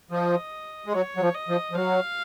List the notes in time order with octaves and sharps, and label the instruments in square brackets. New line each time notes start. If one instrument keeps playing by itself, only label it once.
[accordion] F3 [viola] D#5
[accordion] G#3
[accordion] F#3 [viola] C#5
[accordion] F#3
F3
[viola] D#5
[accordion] F3
F3
[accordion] F#3 [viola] F5